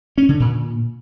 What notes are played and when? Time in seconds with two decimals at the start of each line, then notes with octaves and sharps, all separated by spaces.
0.18 C#4
0.29 D3
0.40 A#2